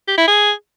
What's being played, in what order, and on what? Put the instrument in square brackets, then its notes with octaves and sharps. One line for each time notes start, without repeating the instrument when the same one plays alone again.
[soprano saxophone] G4
E4
G#4